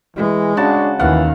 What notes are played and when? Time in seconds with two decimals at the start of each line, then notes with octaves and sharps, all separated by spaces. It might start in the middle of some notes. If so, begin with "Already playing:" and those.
0.16 E3 G#3
0.57 C#3 D4 F#4 A5
1.00 D#2 E3 F5 F#5